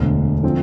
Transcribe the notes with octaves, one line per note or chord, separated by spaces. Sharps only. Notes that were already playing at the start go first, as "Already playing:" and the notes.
Already playing: E1 D2 D3
D3 F3 C4